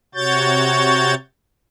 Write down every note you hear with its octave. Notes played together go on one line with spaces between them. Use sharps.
C3 F#4 C#5 G6 A6